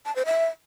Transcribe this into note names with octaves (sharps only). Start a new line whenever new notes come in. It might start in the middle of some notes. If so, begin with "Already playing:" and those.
A5
C5
E5